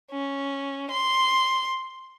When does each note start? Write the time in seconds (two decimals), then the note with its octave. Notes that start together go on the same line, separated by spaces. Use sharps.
0.11 C#4
0.91 C6